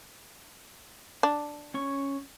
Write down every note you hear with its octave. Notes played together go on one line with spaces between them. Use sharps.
D4
C#4 C#5 C#6